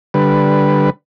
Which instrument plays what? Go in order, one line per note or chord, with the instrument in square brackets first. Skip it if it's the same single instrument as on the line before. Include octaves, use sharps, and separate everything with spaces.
[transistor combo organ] D3 G3 B4